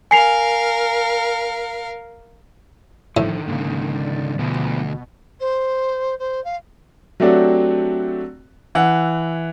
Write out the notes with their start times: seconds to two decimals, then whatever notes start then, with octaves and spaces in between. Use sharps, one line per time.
0.11 A#4 F5 G#5 C7 F7
3.17 A2 D3 D#3 F3
3.48 G#2 C#3 A#3
3.95 D5
4.39 D2 B2 F3 B3
5.39 C5
6.18 C5
6.44 F5
7.20 F#3 A3 C4 D4 F#4 G4
8.75 E3 E4 F#5